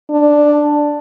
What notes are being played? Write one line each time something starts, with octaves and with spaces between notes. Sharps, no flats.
D4